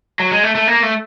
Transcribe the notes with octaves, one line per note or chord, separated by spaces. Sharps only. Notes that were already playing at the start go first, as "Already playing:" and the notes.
F#3
G#3
A3
A3
A#3
A3